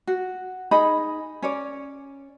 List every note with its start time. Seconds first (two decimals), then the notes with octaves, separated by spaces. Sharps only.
0.07 F#4
0.71 D#4 G#4 D#5 B5
1.42 C#4 C#5 D5